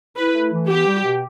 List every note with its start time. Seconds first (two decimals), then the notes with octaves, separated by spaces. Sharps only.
0.17 E4 B4
0.35 A3
0.52 E3
0.69 B3 G4
0.87 G3
1.05 B2